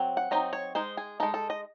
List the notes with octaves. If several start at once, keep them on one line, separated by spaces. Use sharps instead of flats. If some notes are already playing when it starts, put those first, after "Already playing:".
Already playing: F#3 C4
F#5
F#3 C4 D#4 D#5
C#5
G#3 D#4 C5
G#4
G#3 D#4 A4
A4
D#5